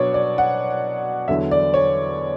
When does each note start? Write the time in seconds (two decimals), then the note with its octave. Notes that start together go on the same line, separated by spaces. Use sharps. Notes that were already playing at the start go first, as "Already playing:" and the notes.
Already playing: B2 F#3 B3 D4 C#5 D5
0.14 D5
0.38 F#5
1.28 E2 D3 F#3 E5
1.51 D5
1.74 C#5